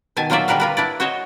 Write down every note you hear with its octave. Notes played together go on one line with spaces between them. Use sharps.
B2 D#3 G#5 A5
A#2 F#3 F4 C5 D5 E5
D3 G3 A#4 B4 F5
F4 A#4 B4
D4 E4 D5
F#4 C5 C#5 D#5